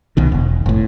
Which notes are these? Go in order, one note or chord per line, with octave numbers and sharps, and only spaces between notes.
C2 B2 D#3
E1
F1 A2